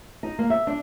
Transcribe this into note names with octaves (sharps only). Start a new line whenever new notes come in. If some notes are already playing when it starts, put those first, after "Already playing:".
D#4
A#3
E5
D4